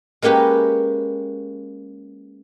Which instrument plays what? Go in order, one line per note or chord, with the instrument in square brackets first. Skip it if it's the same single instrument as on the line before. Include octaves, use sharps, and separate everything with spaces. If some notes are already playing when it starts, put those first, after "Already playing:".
[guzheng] G#3 A#3 C#4 G4 B4